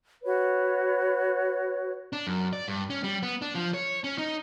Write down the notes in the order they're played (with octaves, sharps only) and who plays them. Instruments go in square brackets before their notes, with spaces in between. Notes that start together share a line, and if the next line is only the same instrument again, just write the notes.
[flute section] F#4 B4 C#5
[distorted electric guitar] D4
F#2
D5
G2
C#4
G3
B3
D4
F3
C#5
C#4
D#4